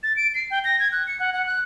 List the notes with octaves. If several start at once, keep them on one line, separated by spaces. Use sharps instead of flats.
A6
D7
C7
G5
A#6
G#6
F#6
C#7
F#5
F#5
F#6